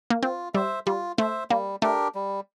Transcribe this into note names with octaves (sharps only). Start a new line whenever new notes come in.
A#3
C4 F4
G3 C5 E5
G3 F4
A3 C5 E5
G3 A#3
A3 D4 G4 A#4
G3